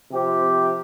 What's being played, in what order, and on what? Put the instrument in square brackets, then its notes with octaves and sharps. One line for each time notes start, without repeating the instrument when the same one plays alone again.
[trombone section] C3 F3 C4 G4